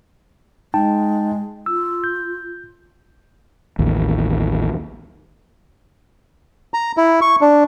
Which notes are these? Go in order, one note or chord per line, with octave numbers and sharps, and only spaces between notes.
G#3 D#4 G5 A5
F4 E6
G6
A1 D#2
A#5
E4
C#6
D4